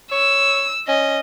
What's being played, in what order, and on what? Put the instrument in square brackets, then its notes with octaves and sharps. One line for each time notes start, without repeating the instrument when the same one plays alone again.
[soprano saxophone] C#5 [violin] E6
[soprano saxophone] C#4 [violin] D#5